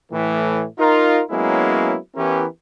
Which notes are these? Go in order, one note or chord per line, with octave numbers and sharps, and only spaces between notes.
A2 E3 A3
D#4 F4 A#4
F#3 G#3 A#3 B3 C#4 E4
E3 B3 C#4 E4 G4 A#4